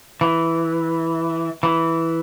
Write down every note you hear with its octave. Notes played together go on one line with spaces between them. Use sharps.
E3
E3